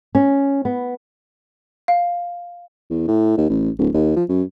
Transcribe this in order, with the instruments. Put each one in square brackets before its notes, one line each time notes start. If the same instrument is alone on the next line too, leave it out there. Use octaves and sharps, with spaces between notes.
[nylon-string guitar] C#4
B3
[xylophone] F5
[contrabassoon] E2
A2
D#2
A1
D1
D#2
F3
F#2